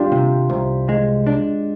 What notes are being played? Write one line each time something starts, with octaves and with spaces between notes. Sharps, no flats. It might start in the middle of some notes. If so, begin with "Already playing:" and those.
Already playing: G3 D4 F4 G4
C3
C2
G#3
D4